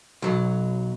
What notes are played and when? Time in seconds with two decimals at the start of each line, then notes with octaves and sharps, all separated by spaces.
0.22 B1 F#3